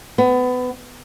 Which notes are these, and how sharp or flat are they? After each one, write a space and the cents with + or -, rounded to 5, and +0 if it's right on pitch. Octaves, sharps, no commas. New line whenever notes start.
B3 +25